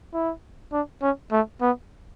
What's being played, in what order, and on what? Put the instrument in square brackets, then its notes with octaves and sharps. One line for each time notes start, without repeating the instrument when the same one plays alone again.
[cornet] E4
D4
C#4
A3
B3